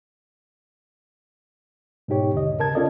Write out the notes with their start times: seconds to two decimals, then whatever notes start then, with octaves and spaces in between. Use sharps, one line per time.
2.08 G#2 B2 D#4 G4 C#5
2.33 D#2 D3 D#5
2.59 C#3 A#4 A5 G#6
2.75 C#4 F4 A4 A#4 D5 D#5